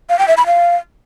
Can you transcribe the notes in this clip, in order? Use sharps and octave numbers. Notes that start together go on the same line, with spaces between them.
F5
G5
E5
B5
F5